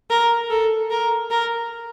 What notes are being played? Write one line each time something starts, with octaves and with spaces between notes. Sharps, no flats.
A#4
A4
A#4
A#4